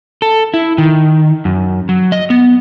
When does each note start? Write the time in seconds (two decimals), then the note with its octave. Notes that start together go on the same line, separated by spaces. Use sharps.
0.22 A4
0.54 E4
0.78 D#3
1.45 F#2
1.89 F#3
2.12 D#5
2.30 B3